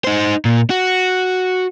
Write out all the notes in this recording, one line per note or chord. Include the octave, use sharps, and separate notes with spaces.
D#4 C5
A#2
F#4